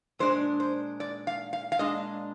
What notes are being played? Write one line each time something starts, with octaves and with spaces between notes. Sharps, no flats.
A#2 G#3 D4 C5
C5
D5
F5
F5
F5
A#2 G#3 D4 D#5